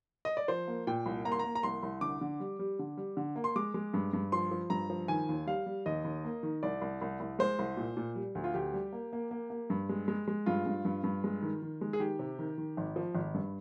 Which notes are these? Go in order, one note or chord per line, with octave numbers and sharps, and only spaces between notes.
D#5
D5
F3 C5
A#3
A#2 G5
C2
A#3 A#5
C6
A#3 A#5
A#5
C2 C6
C2
D3 D6
D3
G3
G3
D3
G3
D3
A#3
C6
G#3 D6
G#3
G2
G2
F3 C6
F3
G2 A#5
F3
D#3 G#5
D#2
G3 F5
G3
D#2 D#5
D#2
A#3
D#3
C2 D5
C2
C2
C2
G#3 C5
C2
A#2
A#2
G3
D2
F4
D2 G4
G3
A#3
A#3
A#3
A#3
G2
G#3
G#3
G#3
G2 F4
G2
G2
G2
G#3
D#3
D#3
G#3
G#4
D#3 G4
C3
D#3
D#3
G#1
F3
G#1
G2